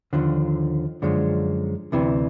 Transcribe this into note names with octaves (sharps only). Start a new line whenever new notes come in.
D#2 D3 F3
F#2 D3 F3 G#3
D2 C3 E3